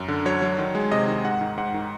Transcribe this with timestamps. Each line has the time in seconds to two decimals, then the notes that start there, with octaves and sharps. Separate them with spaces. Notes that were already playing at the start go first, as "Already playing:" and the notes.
Already playing: F#2
0.08 D3
0.26 F#3 C#5
0.42 F#3
0.58 D#3
0.75 G#3
0.91 C3 D#5
1.08 D#3
1.24 G#2 F#5
1.41 D#3
1.57 G#2 F#5
1.74 D#3